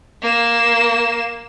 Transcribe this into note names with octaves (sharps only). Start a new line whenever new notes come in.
A#3 E7